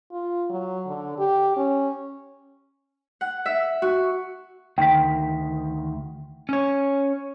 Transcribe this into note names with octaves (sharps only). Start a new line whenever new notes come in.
F4
F#3
D3
G4
C#4
F#5
E5
F#4
D2 D#3 G5 B6
C#4 C#5